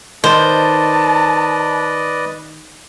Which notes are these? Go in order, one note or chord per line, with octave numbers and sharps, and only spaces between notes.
D#3 B4 C5 D5 D#5 A5